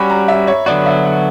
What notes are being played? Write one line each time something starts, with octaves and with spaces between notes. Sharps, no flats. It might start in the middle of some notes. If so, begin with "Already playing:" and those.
Already playing: G3 C#4 F#4 B5
A#5
E5
C#5
D3 F#3 B3 F#4 D5
E5
F#5